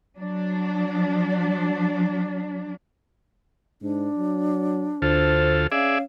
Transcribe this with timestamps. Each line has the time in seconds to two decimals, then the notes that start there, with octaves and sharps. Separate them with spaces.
0.19 F#3 D4
3.82 G#2 D4
4.17 F#3
5.02 D2 F4 A4 C5
5.72 C#4 G#4 D5 E5 F5